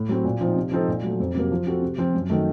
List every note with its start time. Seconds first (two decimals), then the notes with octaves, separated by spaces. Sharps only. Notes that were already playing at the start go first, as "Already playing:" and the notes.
Already playing: A2
0.09 F#3 C4 F#4
0.24 A#2
0.41 F3 C4 D#4
0.56 C3
0.72 F3 C4 D#4 A4
0.88 A#2
1.03 F#3 A3
1.20 F2
1.35 C3 F#3 A#3
1.51 F3
1.66 C4 F#4 A4
1.82 C3
1.98 F3 C4 F4
2.14 F#2
2.30 D#3 F#3 A3 D#4